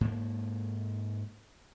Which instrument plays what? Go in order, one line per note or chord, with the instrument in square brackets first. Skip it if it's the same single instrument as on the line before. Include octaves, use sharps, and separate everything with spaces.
[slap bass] G#2 A#3